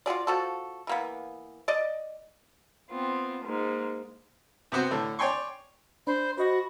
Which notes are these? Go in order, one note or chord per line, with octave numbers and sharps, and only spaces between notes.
F4 F#4 G#4 D5
F3 F#4 A4
E3 A#3 B3
D5 D#5
B3 C4 F4
G#2 A#3
C3 B3 F#4 C5
A2 D3
C#5 D5 G5 G#5 C6 C#6
D4 C5 B5
F#4 C5 D#5 B5 A#6